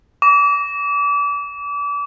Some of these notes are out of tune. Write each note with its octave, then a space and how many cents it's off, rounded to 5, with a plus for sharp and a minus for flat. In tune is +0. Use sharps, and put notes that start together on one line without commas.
D6 -35